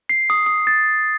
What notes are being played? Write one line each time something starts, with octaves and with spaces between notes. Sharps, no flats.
C7
D#6
D#6
A6